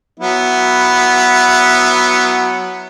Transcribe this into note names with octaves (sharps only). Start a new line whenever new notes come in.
F#3 B3 E4